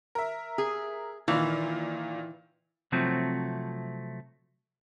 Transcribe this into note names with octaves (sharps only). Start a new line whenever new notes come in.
A#4 E5
G#4
A#2 D#3 E3 F4
C3 F3 F#3 A3 C4